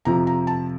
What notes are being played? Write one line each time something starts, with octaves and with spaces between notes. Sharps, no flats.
F2 C3 F3 A#5
A#5
A5